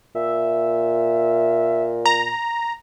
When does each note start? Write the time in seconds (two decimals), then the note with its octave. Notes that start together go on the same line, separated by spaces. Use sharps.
0.15 A#2 E5
2.06 A#5